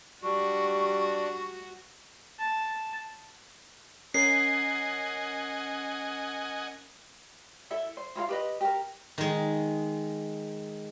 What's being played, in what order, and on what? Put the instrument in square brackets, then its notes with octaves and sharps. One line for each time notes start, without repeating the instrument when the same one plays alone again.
[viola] G3 [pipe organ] D4 [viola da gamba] F#4 [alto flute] C#6
[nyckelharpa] A5
[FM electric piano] C#4 A#4 [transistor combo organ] D#5 F#5 G#5 [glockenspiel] C7
[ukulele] E4 A4 E5
C5
E4 F4 A4 F5
G4 B4 D#5
G4 A#4
[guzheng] D#3 G#3